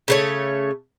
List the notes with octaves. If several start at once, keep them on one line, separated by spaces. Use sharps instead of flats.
C#3 A3 C#5